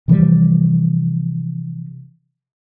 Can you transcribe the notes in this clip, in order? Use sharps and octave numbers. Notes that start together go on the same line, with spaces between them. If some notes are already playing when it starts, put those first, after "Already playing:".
C3 E3 F3 G3